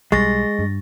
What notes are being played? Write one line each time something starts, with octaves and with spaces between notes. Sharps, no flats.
B1 G3 G#3 C#6 A6 A#6
G2